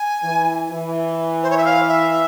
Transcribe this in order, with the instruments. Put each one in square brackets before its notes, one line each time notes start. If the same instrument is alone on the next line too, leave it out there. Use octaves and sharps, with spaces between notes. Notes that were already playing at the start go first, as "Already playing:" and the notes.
Already playing: [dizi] G#5
[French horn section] E3
E3
[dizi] C5
C#5
E5
F5
E5